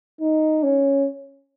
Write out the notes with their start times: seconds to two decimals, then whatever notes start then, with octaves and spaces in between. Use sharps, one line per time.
0.21 D#4
0.63 C#4